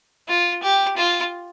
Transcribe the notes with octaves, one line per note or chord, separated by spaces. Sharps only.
F4
G4
F4